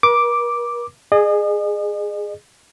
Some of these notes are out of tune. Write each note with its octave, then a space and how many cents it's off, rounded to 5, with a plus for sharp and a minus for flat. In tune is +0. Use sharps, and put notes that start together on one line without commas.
A#4 +45 D6 +0
G#4 +0 D#5 -40